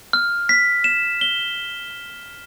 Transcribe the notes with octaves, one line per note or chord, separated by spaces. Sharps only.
F6
B6
E7
G7